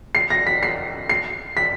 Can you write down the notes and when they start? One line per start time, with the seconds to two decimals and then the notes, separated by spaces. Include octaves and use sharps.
0.15 C7
0.30 A#6
0.47 B6
0.63 C7
1.09 C7
1.57 B6